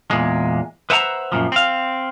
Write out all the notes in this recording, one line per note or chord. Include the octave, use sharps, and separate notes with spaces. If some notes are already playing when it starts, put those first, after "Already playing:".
E2 A#2 G#3
B4 C5 E5 F#5 G5 A#5
F#2 A#2 F3
C4 F5